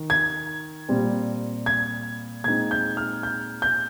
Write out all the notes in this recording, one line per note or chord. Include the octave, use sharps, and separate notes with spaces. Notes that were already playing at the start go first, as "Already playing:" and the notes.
Already playing: D#3
G#6
A#2 G3 C4
G#6
A#2 G#3 C4 D#4 G#6
G6
F6
G6
G6